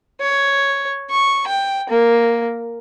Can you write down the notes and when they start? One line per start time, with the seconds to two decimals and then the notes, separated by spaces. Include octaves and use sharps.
0.21 C#5
1.10 C#6
1.47 G5
1.89 A#3